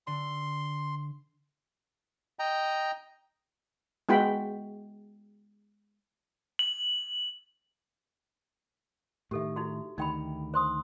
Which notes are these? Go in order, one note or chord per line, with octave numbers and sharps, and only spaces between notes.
D3 C6
D#5 G5 A#5
G#3 B3 E4 F#4 G5 B5
F#7
A2 D#3 G4 A4 E5
D#4 E4 F#4
D2 D#3 D#4 G5 B5
C5 C6 D#6